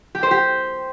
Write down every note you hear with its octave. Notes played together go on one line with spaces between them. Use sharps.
G4
C5
G4